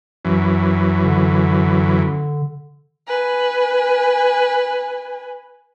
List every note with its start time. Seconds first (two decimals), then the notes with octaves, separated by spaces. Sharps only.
0.25 F#2 E3
1.04 D3
3.07 B4 G#5